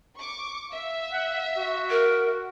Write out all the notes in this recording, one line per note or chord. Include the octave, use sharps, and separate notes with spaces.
C#6 D6
E5 F5
F#5
F#4
A#4